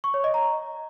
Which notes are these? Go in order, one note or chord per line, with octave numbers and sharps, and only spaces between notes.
C#6
C#5
D#5
A#5